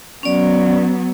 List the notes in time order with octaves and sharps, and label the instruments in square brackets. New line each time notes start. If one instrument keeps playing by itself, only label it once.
[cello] F#3 B3 [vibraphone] C#4 D5